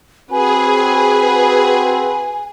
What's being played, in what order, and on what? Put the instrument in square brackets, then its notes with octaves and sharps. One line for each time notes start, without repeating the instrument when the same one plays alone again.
[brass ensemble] C4 F#4 [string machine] G#4 [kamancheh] B4 [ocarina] G#5